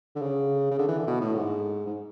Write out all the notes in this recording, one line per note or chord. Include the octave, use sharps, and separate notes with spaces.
D3
C#3
C#3
D3
E3
D3
B2
A2
G#2
G#2